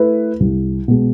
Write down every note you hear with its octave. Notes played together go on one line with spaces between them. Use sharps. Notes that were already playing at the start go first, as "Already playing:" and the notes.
Already playing: A3 E4 B4
C2
B2 G#3